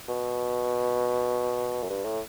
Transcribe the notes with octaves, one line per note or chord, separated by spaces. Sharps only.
B2
F#2
G2
A2